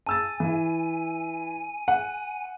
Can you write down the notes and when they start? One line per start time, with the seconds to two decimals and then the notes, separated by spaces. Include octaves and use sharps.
0.07 G#5 A5 E6 A6
0.40 E3 E4
1.88 F#5